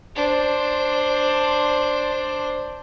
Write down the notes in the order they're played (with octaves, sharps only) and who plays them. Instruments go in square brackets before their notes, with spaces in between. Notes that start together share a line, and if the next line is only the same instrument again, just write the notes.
[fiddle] D4 C5